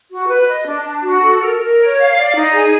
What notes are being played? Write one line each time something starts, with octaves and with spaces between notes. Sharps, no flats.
F#4
B4
D#5
D4
D4
F#4
A4
A#4
A#4
C#5
F5
D5
D#4
G#4